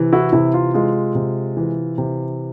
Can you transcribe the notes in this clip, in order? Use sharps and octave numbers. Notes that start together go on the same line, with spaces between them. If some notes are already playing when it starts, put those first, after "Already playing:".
Already playing: C3 E3
E4 F#4
C3 E4
F4
G#3 F4
C3
E3
C3